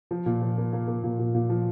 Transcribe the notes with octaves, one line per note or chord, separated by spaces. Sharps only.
F3
A#2
F3
A#3
A#3
A#3
A#2
A#2
A#2
F3